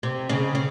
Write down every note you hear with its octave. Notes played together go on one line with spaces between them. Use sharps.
C3
C#3
C#3